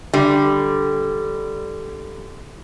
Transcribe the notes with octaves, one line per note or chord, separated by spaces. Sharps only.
D3 G3